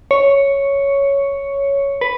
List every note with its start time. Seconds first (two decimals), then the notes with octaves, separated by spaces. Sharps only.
0.11 C#5
2.01 B4